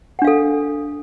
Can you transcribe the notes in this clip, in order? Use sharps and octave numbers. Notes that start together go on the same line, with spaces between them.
D4 A4 F5 F#5